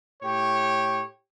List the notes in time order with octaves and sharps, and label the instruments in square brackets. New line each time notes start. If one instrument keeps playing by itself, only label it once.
[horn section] A2 G4 C#5